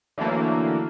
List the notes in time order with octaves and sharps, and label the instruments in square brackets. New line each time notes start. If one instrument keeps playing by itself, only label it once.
[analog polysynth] D3 E3 F#3 A3 A#3